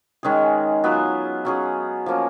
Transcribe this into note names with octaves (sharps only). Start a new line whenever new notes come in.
D#3 G#3 C#4 G#4
F#3 B3 F4
F#3 C#4 G#4
F3 A#3 C#4